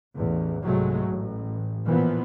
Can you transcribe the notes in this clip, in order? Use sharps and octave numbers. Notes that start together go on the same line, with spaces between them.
A1 E2
C2 G#2 F#3 G#3 A3
A1
A#2 E3 F3 B3